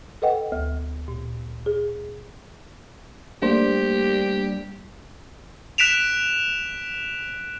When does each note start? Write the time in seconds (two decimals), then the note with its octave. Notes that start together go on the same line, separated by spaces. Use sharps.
0.22 A4 B4 D#5 F#5 G5
0.52 D2
1.08 A#2
1.66 G#4
3.42 G3 A3 A#3 D4 G4 C5
5.78 F#6 B6 D7 E7 F7